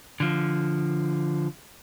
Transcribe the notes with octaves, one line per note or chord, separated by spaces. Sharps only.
D3 F3